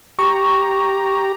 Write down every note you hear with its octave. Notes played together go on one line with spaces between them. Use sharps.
G4 A#5 C#6